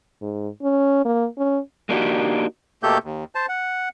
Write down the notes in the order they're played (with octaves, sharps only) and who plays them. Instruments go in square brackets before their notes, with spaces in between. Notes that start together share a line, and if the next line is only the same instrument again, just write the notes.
[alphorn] G#2
C#4
A#3
C#4
[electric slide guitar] G#3 A#3 D4 D#4 F#4 G4
[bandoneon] B2 A3 A#3 G4 A4 G6
D#2
C5 A5
F#5